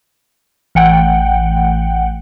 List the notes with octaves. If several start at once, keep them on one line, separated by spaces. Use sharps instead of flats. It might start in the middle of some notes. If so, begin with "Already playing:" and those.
A1 F#5 G5